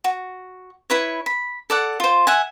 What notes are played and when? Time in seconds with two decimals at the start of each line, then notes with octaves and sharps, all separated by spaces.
0.04 F#4
0.90 E4 B4 C#5
1.26 B5
1.70 A4 D5 F#5
2.00 F4 C5
2.27 E5 F#5 G#5